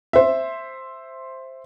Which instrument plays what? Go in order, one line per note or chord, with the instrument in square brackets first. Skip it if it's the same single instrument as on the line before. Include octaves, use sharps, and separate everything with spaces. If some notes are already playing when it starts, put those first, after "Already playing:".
[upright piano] C5 E5